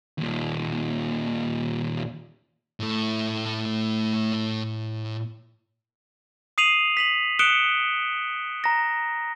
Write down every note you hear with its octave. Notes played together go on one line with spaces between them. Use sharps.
D#2 A#2
A2 A3
D#6 C7 D#7 F7 F#7
B6 F7 F#7
D#6 F#6 C#7 D7 E7 G7
A#5 A#6